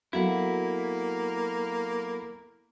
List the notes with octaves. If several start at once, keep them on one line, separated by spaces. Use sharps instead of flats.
F#3 A#3 B3 E4 F#4 A4 F5